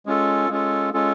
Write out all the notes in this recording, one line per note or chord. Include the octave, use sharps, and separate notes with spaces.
G#3 C#4 F4 A4
G#3 C#4 F4 A4
G#3 C#4 F4 A4